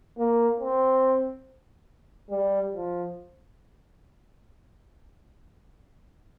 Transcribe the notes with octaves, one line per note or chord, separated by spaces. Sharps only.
A#3
C4
G3
F3